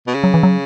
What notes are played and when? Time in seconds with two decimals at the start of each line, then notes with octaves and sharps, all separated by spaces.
0.07 B2
0.14 C#3
0.24 F#3
0.34 E3
0.43 F#3